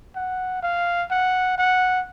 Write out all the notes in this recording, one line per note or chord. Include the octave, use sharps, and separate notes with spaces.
F#5
F5
F#5
F#5